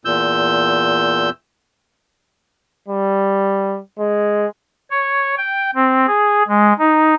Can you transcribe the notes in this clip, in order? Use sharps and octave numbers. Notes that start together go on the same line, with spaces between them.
E2 A#2 E6 G6
G3
G#3
C#5
G5
C4
G#4
G#3
D#4